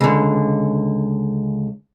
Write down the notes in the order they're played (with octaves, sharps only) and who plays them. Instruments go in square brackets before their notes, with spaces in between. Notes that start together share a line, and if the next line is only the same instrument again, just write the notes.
[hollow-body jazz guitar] C#2 D3